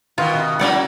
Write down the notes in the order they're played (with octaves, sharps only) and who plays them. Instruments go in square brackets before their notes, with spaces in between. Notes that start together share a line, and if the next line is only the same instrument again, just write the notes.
[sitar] B2 D#3 [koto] F4
[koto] C3
[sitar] F#3 A#3 E4 [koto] C#4 D5 F#5